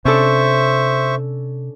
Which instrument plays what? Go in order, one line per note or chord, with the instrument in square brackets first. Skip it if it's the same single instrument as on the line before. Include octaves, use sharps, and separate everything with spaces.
[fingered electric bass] C3 [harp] C#4 D4 A4 [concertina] C5 E5 C#6